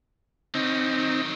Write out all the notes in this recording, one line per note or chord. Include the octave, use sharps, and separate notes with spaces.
D3 C4 C#4 D#4
D#3 F#3